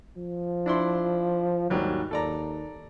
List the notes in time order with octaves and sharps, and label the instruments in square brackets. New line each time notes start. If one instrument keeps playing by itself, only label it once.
[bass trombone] F3
[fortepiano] D4 E4 C6
[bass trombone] D#2 [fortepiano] G#2 F#3 G3
[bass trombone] D#2 [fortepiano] A4 D5 A#5